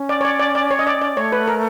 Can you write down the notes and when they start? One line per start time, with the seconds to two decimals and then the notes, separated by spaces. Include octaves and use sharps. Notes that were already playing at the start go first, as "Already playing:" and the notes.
Already playing: C#4
0.09 D5
0.21 C#5
0.25 D5
0.39 D5
0.55 D5
0.71 C#5
0.79 D#5
0.87 D5
1.02 D5
1.16 A3 C#5
1.32 B4
1.48 A#4